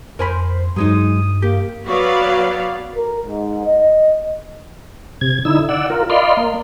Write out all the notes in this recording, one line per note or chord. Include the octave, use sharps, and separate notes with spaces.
F2 A#4 C5 G#5 B5
G2 F#3 G#3 D#4 D#6
A#3 G4
F#3 B3 F#4 B4 D5 F5
A#4
G#2
D#5
C3 G#6
D3 D#4 E4 E6
D5 F#5 E6
F4 A#4
D5 D#5 F5 B5 C6
A#3